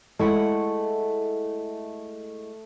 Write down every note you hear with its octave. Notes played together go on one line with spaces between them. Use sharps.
G#3 A3 E4 F#5